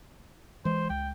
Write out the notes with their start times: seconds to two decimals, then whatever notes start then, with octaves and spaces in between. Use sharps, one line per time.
0.65 E3 G#3 C5
0.90 C#2 G5